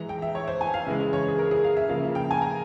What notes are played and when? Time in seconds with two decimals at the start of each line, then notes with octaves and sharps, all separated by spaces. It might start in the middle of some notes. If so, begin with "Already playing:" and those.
Already playing: E3 G#3 A#5
0.09 G5
0.22 E5
0.35 C#5
0.47 C5
0.61 G#5
0.74 F5
0.87 C#3 E3 G#3 E5
1.13 C#5
1.28 G#4
1.38 A#4
1.51 G#4
1.64 F5
1.77 E5
1.89 C#3 F3 A#3 F5
2.15 G5
2.31 G#5
2.42 A#5